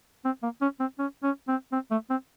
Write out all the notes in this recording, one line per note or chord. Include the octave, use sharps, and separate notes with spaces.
C4
A#3
C#4
C4
C#4
C#4
C4
C4
A3
C4